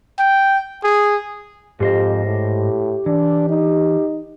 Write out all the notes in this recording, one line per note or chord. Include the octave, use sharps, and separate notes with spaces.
G5
G#4
F2 G#2 G4 C5 D#5
A2
E3 D4
D#4